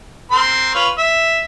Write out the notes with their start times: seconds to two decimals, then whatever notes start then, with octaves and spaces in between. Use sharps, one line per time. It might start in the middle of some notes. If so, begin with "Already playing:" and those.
0.32 C4 A#4 C6
0.75 F4 B4 C#5
0.98 E5